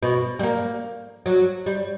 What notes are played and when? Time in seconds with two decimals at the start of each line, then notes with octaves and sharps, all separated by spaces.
0.03 B2
0.39 G3
0.43 A#3
1.26 F#3
1.66 G3